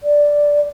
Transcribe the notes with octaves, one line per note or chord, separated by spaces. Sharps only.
D5